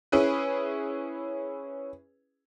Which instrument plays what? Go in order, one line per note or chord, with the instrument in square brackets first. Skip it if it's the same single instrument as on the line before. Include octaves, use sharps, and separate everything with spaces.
[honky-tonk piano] C#4 E4 G#4 B4